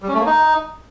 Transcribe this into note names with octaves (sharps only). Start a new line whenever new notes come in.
G3
C#4
A3
A#3
D#4